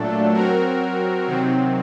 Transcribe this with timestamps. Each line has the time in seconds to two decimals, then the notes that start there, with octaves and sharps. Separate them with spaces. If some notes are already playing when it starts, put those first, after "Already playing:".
Already playing: A#2 F#3 A3 D4 A4
0.33 F#3 C4 F#4 A#4
1.27 C3 D#3 F#3 C4